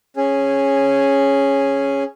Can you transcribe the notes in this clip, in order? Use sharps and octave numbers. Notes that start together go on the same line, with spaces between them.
C#4 G#4